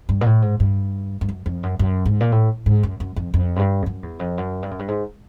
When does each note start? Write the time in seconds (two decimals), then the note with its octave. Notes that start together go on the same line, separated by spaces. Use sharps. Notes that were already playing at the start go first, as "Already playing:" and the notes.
0.09 G2
0.21 A#2
0.26 A2
0.42 G#2
0.60 G2
1.21 G2
1.29 F#2
1.46 F2
1.63 F#2
1.79 F#2
2.05 G#2
2.20 A#2
2.32 A2
2.66 G#2
2.83 F#2
3.00 F#2
3.16 F2
3.34 F2
3.56 F#2
3.59 G2
3.82 F2
3.86 F#2
4.03 E2
4.19 F2
4.38 F#2
4.63 G2
4.71 F#2
4.79 G2
4.88 G#2